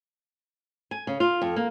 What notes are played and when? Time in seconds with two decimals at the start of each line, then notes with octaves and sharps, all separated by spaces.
0.91 G#5
1.07 C#3
1.20 F4
1.41 F2
1.56 A#3